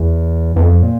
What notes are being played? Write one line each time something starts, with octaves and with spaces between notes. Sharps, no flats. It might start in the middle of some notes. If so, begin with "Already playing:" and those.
Already playing: E2
E2
F2
A#2